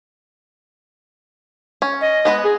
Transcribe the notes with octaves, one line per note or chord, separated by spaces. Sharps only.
C#4
D#5
G#3 B3 B4
G#4